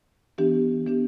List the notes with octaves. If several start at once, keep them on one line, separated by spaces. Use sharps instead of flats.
E3 B3 D4 G4
E3 B3 D4 G4